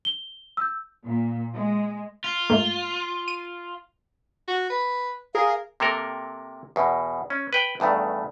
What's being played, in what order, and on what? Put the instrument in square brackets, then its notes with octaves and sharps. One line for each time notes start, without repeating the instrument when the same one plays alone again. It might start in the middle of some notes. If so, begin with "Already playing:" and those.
[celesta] G7
E6 G6
[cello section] A#2
G#3
[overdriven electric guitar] F4
[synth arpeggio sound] G#2 A3 A#3
D#7
[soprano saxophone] F#4
B4
[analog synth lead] G#4 [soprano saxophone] A#4 [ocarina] F5
[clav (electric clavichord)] C3 A#3 A4 A#4
E2 B2
C#4
B4 G5
E2 G2 D#3 A3